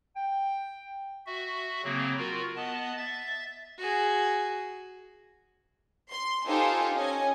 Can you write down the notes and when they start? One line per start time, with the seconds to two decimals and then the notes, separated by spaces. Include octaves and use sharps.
0.16 G5
1.26 F#4 E5
1.84 C#3 F#3 A#3 C4
2.18 F4 F#4 A#4
2.56 B3 D#5 A5
2.98 E5 A6
3.78 F#4 G#4
6.10 C6
6.47 D#4 F4 G4 A4 C5 G#5
6.94 C#4 D#5 G#5